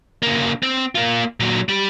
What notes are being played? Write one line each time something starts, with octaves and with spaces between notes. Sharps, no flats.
C#3 A#3
C4
A#3 F4
A#2 F#3
G3